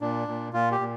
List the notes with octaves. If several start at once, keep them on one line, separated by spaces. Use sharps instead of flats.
A#2 D4
A#2
A#2 F4
G4
A#2